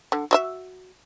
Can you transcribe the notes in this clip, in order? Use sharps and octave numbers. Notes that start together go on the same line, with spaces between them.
D3
F#4 D#5 E5